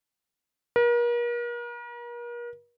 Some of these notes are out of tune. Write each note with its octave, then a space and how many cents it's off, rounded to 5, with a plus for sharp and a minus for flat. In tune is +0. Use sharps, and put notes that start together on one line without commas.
A#4 +40